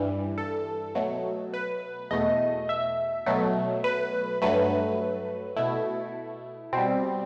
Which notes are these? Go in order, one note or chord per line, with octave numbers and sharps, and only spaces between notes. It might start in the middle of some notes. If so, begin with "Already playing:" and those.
Already playing: G2 E3 G3
A4
B2 F#3 A3
B4
E2 B2 A3 D#5
E5
B2 F#3 A3
B4
G2 F#3 A3 B4
B2 A3 E4
B2 G3 C4